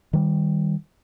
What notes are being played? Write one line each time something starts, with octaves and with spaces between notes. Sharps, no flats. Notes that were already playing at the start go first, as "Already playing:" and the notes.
D#3 G3